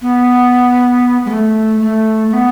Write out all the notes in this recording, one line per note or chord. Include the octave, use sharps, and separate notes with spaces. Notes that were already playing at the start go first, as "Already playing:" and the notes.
B3
G#3
A3
A3
A3
B3